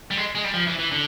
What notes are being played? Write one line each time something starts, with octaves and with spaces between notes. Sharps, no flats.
G3
G#3
G#3
G3
F3
E3
E3
D3